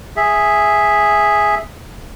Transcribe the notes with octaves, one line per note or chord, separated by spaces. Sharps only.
G#4 E5